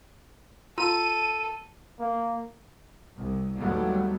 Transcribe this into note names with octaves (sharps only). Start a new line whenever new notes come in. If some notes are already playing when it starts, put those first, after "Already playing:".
F4 A4 A#5 E6 D#7
A#3
C2
D#2 A2 F#3 G3 A3 B3